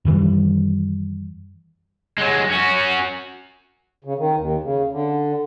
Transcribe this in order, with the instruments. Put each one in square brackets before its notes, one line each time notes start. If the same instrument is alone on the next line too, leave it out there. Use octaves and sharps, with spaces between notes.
[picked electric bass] F#2 D#3 E3 G3
[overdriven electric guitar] F#3 G#3
C#4 F#4
[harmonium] C#3
D#3
D#2
C#3
D3